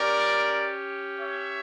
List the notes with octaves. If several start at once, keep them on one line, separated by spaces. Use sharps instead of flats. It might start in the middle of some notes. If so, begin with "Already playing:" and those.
Already playing: C#4 G4 A#4 D5
C#5 E5